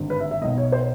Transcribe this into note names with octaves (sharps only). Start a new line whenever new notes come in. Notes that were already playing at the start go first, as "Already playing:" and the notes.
Already playing: G#1 G2 D3
B4
E5
E5
B1 B2 D#5
C#5
C5